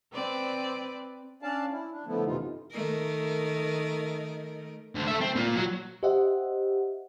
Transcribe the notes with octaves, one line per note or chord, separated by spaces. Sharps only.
C4 B4 D5
C#4 D4 D5 F5 A5
E4
D4
D3 F3 A3 B3 E4
F#2 C3 E3 D#4 F4
D#3 A3 A#4
D2
A4 E5
C4
A#2 F4
F#3
G4 C5 D#5 E5 F#5